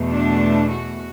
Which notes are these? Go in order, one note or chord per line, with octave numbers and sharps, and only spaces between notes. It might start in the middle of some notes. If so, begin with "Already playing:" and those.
Already playing: E2 B2 A3
D4
F#4